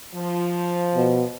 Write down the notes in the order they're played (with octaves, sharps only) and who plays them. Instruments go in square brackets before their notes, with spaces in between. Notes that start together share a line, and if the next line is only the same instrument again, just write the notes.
[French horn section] F3
[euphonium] B2